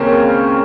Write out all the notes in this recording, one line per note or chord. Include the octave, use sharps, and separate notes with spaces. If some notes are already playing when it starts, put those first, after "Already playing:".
Already playing: C#2 C#3 A#3 C4 C#4